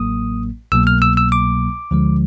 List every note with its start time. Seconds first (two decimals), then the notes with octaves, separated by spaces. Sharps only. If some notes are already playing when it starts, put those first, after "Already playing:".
Already playing: A1 A2 F#3 A#3 D#6
0.72 C2 B2 F#3 A#3 E6
0.87 F6
1.02 E6
1.17 E6
1.32 D6
1.91 D2 D3 F3 G#3